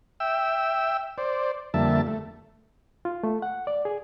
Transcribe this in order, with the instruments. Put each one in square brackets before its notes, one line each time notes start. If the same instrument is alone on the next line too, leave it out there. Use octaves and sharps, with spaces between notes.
[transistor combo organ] E5 G5 E6
C5 D5
F2 D3 G3 A#3 E5 A5
A3
[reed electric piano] F4
A3
F#5
D5
G#4